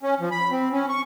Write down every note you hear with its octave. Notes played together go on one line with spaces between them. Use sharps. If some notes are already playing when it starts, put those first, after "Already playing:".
C#4
F3
B5
C4
C#4
C#6